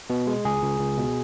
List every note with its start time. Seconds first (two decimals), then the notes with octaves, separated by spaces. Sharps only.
0.10 B2
0.27 G#3
0.45 C#2 G#4
0.63 C#2
0.80 C#2
0.98 B2